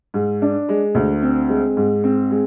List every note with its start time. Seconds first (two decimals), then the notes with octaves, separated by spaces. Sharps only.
0.14 G#2
0.42 D4
0.69 G#3
0.95 D2
1.22 C4
1.49 G#3
1.77 G#2
2.04 C4
2.31 G#3